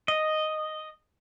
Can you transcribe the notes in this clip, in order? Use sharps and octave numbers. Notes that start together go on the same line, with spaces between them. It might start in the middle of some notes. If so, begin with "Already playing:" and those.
D#5